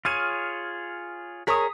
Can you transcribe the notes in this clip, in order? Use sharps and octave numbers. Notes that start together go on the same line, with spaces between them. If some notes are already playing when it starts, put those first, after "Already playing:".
F4 G#4 C#5 F6 G#6 D#7
G#4 A#4 C#5 D#6 B6